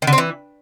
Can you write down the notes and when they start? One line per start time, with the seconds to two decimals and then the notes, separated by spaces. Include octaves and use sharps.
0.02 D#3
0.07 D3
0.13 C4
0.18 E3